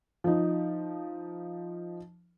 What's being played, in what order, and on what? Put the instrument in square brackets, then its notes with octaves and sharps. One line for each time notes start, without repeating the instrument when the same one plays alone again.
[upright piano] F3 D#4